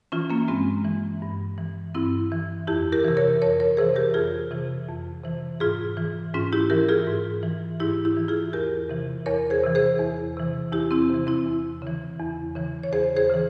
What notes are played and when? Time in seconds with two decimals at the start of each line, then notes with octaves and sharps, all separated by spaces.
0.12 E3 C#4 F4
0.30 A#3 C#4
0.48 G2 G#3 C4
0.85 E3
1.22 G2
1.58 E3
1.95 G2 C4 E4
2.32 E3
2.67 F2 E4 G4
2.92 G4 A#4
3.04 C3 E3
3.17 A#4 C#5
3.42 F2 A#4 C#5
3.60 A#4 C#5
3.77 C3 E3 G#4 C5
3.96 G4 A#4
4.14 F2 F4 G#4
4.51 C3 E3
4.88 F2
5.24 C3 E3
5.60 G#2 F4 G#4
5.97 E3
6.34 G#2 C#4 F4
6.53 E4 G4
6.70 E3 G4 A#4
6.89 F4 G#4
7.07 G#2
7.43 E3
7.80 G#2 E4 G4
8.05 E4 G4
8.17 E3
8.28 F4 G#4
8.53 E2 G4 A#4
8.90 C3 E3
9.26 E2 A#4 C#5
9.50 G#4 C5
9.63 C3 E3
9.75 G#4 C5
10.00 E2
10.37 C3 E3
10.72 E2 E4 G4
10.91 C4 E4
11.09 C3 E3
11.27 C4 E4
11.46 E2
11.82 C#3 E3
12.20 E2
12.56 C#3 E3
12.84 C#5
12.92 E2 G#4 C5
13.16 G#4 C5
13.29 C#3 E3